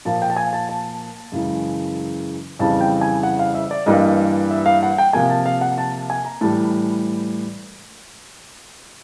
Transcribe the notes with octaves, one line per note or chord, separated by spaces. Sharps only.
A#2 F3 A#3 A5
G5
A5
G#5
A5
A5
F#2 C#3 E3 G#3
F2 C#3 E3 G3 A5
G5
G#5
F#5
F5
E5
D5
G2 E3 G3 A#3 D#5
E5
F5
F#5
G5
C3 F3 A#3 G#5
A5
F5
F#5
A5
G#5
A#5
A2 E3 G3 A5